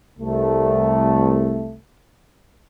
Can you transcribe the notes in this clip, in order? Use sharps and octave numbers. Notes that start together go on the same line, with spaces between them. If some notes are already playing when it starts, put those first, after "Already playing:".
C2 A3